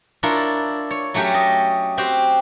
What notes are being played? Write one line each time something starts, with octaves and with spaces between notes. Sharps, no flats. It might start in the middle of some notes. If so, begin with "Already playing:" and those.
D4 E4 F4 A#4 C#5
C#5
F#3 A3 C#4 F#4 G4
D#5
C4 F#4 G4